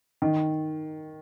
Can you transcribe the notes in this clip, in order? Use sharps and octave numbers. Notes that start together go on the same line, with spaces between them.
D#3